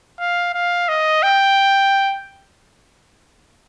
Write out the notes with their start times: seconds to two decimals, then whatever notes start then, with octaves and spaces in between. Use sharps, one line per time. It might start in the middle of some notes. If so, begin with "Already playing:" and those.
0.20 F5
0.54 F5
0.88 D#5
1.23 G5